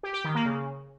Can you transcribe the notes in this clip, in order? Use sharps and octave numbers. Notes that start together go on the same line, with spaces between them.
G4
G4
D#3
A#3
C#3